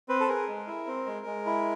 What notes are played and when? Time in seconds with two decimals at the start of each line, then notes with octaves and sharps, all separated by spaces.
0.08 C4 B4
0.20 A4
0.28 G#4 A#4
0.48 G#3
0.67 E4
0.87 C4
1.06 G#3
1.26 G#3
1.46 E4